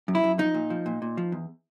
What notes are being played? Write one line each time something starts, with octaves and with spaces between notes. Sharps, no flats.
F#2
E4
F#2
F3 D#4
A#2
F3
A#2
A#2
F3
E2